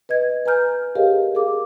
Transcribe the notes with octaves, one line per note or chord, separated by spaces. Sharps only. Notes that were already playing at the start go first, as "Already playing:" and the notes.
B4 D#5 G#6
B4 G#5 A#5 F6 G6
G4 G#4 A#4 C#5 D#5 F5
G#4 A#4 F5 D6